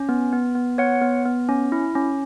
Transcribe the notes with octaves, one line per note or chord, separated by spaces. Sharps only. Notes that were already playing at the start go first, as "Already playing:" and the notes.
Already playing: C#4
B3
B3
B3
B3 C#5 F#5
B3
B3
C#4
E4
C#4